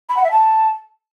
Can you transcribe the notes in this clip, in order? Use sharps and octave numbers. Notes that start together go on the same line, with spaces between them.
B5
F#5
E5
A5